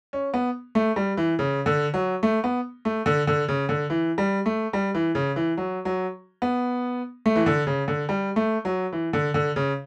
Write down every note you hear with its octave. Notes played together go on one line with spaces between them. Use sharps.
C#4
B3
A3
G3
E3
C#3
D3
F#3
A3
B3
A3
D3
D3
C#3
D3
E3
G3
A3
G3
E3
C#3
E3
F#3
F#3
B3
A3
E3
D3
C#3
D3
G3
A3
F#3
E3
D3
D3
C#3